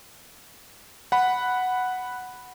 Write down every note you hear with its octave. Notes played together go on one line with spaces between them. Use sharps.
F#5 B5